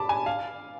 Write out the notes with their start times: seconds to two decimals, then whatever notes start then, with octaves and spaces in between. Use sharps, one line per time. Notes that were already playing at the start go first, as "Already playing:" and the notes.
Already playing: A5 B5 D6
0.09 G#5
0.26 F5